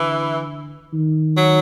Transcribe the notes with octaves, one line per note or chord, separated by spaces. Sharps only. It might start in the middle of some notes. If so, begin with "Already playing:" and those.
Already playing: D3 E3
D#3
F#3